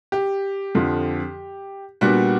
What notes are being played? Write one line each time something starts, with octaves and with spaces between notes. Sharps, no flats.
G4
F2 D3 F3
A#2 G3 B3 D4 F#4